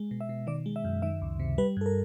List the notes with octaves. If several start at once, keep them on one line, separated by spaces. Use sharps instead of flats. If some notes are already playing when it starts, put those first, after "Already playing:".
Already playing: G#3
B2
E5
B2
D#3 D5
G#3
E5
F#2
D#3 E5
C#2
C3
G3 B4
G2 A4
A#4